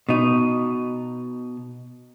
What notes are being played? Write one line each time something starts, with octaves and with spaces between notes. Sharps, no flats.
B2 D#4